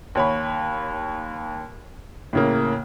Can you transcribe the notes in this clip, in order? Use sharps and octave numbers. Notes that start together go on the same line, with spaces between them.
D#2 C#5 B5
A2 C#3 A#3